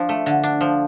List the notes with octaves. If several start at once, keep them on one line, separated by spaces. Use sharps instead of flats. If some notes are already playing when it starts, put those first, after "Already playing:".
Already playing: F3 D4
A3
D3
D4
F3